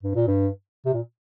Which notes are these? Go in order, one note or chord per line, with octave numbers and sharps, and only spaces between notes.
G2
A#2
G2
C3
A#2